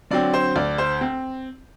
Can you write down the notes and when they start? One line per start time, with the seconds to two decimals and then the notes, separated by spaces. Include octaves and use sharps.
0.11 D3 F#3 C4 D5
0.34 C5
0.56 D2 D5
0.78 C5
1.01 C4